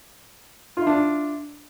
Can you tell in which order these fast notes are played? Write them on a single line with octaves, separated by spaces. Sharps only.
F4 E4 D4